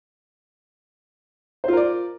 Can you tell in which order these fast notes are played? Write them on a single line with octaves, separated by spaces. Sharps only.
C5 F4 A#4 D5